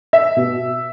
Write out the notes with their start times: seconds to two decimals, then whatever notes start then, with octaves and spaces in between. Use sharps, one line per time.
0.13 E5
0.37 B2